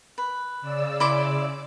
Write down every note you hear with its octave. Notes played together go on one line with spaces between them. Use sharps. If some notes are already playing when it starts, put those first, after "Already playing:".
B4
C#3 D5 E6
E4 C6 D6